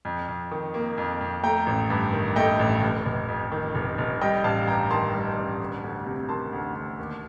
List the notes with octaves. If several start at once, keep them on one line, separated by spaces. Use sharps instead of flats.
F2
F2
D#3
A#3
F2
F2
A3 G5 A#5
A1
G2
D#3
A3 D#5 G5
A1
F1
F1
F2
D#3
F1
F1
G3 D#5 G5
A1 F5 A5
G2 G5 A#5
D#3 A5 C6
G3
A1
D2
D2
C3
D#3 A5 C6
D2
D2
D#2